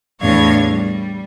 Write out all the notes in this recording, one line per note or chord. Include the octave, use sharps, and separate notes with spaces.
E2 A2 D4 C#5 F5 G#6
G3